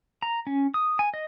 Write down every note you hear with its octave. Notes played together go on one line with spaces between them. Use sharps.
A#5
C#4
D#6
G#5
D#5